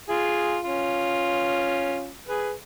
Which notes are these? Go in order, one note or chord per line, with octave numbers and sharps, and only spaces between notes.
F4 G#4
C#4 F4
G#4 B4